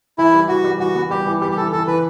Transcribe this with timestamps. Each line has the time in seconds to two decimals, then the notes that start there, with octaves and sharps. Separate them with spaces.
0.18 E3 E4
0.33 G3
0.48 E3 F#4
0.64 G3
0.79 E3 F#4
0.95 B3
1.10 G3 G4
1.26 E3
1.41 G3 G4
1.51 G4
1.56 E3 A4
1.72 E3 A4
1.87 E3 B4